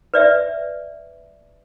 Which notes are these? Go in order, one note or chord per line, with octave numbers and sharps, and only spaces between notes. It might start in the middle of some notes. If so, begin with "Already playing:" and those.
B4 D5 E5